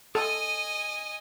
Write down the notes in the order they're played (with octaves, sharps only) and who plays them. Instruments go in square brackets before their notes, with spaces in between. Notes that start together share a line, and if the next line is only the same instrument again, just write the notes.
[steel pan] A4 [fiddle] D#5 G#5